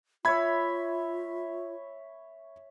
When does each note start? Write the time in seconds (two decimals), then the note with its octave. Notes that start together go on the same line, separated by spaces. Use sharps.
0.25 F4 C#5 E5 B5 G#6